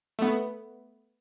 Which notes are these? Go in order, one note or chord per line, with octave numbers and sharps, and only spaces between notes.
A3 B3